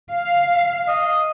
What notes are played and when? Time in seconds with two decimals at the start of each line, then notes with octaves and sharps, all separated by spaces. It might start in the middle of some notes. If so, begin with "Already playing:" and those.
0.14 F5
0.88 D#5